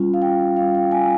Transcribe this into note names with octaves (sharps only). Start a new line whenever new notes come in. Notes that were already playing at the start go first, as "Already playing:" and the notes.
Already playing: G3 C#4 F4
F5
G5
G3 C#4 F4 F5
G5
G#5